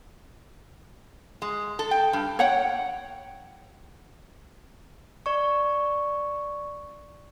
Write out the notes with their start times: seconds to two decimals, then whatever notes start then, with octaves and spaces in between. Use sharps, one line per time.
1.42 G#3
1.79 A4
1.91 G5
2.13 G2
2.39 C#5 F#5 G5
5.26 D5 C#6